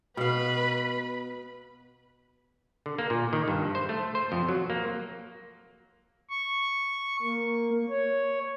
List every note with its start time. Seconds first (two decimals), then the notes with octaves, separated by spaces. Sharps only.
0.17 B2 B4 F5 B5
2.86 D3
2.98 A#3
3.10 A#2
3.33 D#3
3.48 G2
3.75 C5
3.89 A3
4.15 C5
4.32 F2
4.49 F#3
4.70 A#3
6.30 C#6
7.22 A#3
7.90 C#5